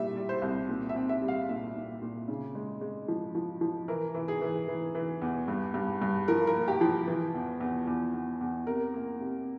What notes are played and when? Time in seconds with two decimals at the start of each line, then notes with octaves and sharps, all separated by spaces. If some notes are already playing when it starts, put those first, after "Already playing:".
Already playing: A#2 G3 E5
0.16 G3
0.29 C5
0.42 C2
0.69 A#2
0.89 E5
0.96 C4
1.09 E5
1.22 G3
1.28 F5
1.49 A#2 E5
1.75 A#2
2.02 A#2
2.28 C#3
2.55 G#3
2.81 G#3
3.08 F3
3.35 F3
3.61 F3
3.88 E3 A#4
4.14 E3
4.28 G#4
4.41 E3
4.68 E3
4.95 E3
5.22 E2
5.48 G2
5.74 G2
6.02 G2
6.28 F3 A#4
6.47 A#4
6.54 A#3
6.68 G4
6.81 F3
7.07 E3
7.34 E2
7.60 E2
7.87 E2
8.14 E2
8.41 E2
8.67 C3 A#4
8.94 A#3
9.20 C3